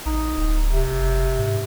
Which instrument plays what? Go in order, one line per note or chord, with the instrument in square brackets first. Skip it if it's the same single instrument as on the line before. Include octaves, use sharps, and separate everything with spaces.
[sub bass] A1 [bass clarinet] D#4
[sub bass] D1
[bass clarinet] C3
[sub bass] F#1
G#2